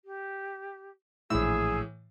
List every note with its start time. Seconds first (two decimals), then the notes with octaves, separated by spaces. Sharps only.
0.05 G4
1.30 A#1 A2 E3 G#4 E6